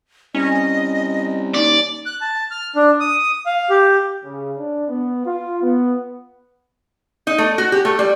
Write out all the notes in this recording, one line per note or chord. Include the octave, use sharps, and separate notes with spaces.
C2 C#4 D#5
D#2 D5
F#6
A5
F6
D4
D#6
F5
G4
C#3
D4
B3
F4
B3
D#4
A3
F#4
G4
A3
G3